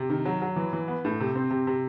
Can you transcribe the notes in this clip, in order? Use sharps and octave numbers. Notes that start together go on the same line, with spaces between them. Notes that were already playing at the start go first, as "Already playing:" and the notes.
Already playing: C3
D#3
F#3
F#3
E3
E3
B3
A2
C3
C4
C3
C3